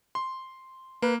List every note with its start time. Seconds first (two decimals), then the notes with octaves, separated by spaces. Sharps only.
0.15 C6
1.02 A#3 B4